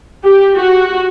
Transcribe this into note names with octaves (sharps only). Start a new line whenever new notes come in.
G4
F#4